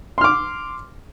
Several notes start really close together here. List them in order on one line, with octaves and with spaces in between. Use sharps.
C6 F6 D6